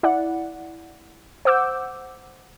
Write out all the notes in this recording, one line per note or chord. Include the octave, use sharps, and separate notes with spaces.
E4 D5 F#5
C5 F#5 D6 E6 G6